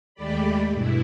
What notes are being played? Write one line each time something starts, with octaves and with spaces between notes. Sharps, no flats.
D#2 G#3 A3 G4 D5 B5
G2 B2 E4